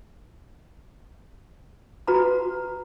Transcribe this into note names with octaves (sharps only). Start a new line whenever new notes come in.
F#4 B4 A#5 B5